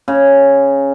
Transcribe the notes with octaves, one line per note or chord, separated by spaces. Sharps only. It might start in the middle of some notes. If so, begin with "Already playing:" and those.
C#3